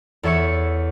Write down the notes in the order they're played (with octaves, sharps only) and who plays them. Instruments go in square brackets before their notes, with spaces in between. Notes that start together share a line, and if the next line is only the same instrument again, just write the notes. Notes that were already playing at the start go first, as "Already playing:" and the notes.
[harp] E2 A4 C#5 E5 C#6 C#7